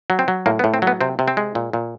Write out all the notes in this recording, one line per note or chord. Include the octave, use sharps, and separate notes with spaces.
F#3
C4
F#3
A2 A#3
B3
A2
C4
F#3
B3
C3 C4
C3
C4
G#3
A#2
A#2